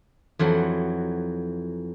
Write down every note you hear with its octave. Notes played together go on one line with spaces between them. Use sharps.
F2 E3 F#3